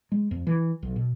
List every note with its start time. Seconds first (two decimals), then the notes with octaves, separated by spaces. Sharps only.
0.12 G#3
0.31 F2
0.47 E3
0.83 B1
0.96 B2